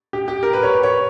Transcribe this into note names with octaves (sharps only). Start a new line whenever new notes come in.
G4
G4
A#4
B4
C#5
B4
C#5